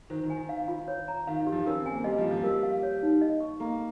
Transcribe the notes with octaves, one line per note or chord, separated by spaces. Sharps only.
D#3 C5
D#3
G#5
D#3
F5
F4
C#5
A#5
D#3 F5
D#3
G4
F3
C#4 A#4
C4
G#5
A#3
G3 D#5
F3
F4
F3
G3 A#4
F5
C#5
D#4
D#5
C#6
A#3 A#5